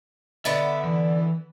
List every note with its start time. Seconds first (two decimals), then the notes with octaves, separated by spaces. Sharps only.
0.45 D3 B3 D5 E5
0.84 E3